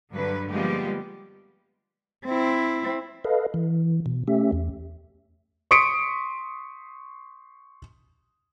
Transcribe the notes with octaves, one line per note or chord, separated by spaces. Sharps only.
G2 D3 F#3 B4
F3 G3 G#3 A#3 B3 G4
C4 E4
A4 B4 D#5 F5
E3
B2
A3 C#4 G4 E5
E2
C6 C#6 D#6 B6 C#7 D7